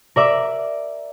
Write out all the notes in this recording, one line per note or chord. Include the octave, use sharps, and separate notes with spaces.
A#4 D5 E5 D6